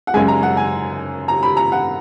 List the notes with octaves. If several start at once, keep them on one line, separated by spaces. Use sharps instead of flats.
F#5
F#2 C#3 G#3 G#5
A#5
F#5
G#5
A#5
B5
A#5
F#5